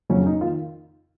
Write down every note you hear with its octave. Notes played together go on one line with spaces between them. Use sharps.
F2 C#3 F#3 C#4
D#4
D#3 F4